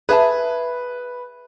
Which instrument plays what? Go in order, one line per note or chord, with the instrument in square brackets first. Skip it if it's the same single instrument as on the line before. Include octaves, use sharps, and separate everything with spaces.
[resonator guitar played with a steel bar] G#4 E5 A5 [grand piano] B4